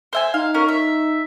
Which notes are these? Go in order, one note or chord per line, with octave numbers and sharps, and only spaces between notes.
C5 E5 G#5
D#4 F5
C#4 A#4
E5